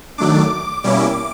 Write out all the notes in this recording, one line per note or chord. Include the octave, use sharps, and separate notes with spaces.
D#3 F#3 A3 D4 D6
B2 G3 A#3 C#4 E4 D6